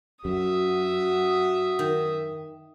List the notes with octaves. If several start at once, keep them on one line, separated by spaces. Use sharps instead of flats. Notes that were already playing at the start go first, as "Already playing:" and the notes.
F#2 F#4 E5 D#6
D#3